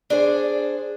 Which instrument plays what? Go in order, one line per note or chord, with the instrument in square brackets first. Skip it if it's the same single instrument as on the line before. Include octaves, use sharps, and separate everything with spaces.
[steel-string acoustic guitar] D4 G#4 A4 C5